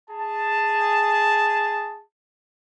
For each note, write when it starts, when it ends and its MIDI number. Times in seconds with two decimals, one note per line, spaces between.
0.10 2.02 68
0.10 2.02 81